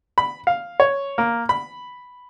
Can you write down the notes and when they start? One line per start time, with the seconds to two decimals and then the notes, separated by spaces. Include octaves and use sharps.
0.18 B5
0.47 F5
0.80 C#5
1.18 A#3
1.49 B5